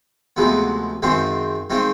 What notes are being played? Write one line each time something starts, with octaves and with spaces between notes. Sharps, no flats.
D2 C3 F3 G#3 B3
F#2 D#3 G#3 C4 F4
D#3 G#3 C4 F4